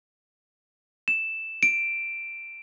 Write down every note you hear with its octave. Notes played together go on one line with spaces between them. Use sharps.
E7
D7